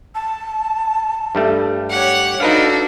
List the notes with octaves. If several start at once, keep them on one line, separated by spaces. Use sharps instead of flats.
A5
G2 G3 A3
G4 C#5 F#5
D4 D#4 F#4 A4 B4 F5